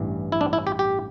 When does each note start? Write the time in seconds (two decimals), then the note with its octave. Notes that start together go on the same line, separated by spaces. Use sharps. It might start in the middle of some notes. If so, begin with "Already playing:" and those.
Already playing: A1 G2 E3
0.32 E4
0.41 D4
0.53 E4
0.67 G4
0.79 G4